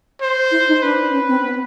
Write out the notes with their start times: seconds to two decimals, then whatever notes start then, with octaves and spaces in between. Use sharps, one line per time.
0.21 C5
0.51 E4
0.68 D#4
0.83 D4 B4
1.09 D4
1.13 C#4
1.29 C4
1.44 B3